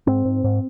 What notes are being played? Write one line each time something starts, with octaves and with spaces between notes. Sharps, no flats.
G#2 C4
G#2
G#2